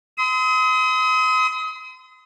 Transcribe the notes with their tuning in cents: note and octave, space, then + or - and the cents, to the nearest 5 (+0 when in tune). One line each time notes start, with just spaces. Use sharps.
C6 -35 D#6 +35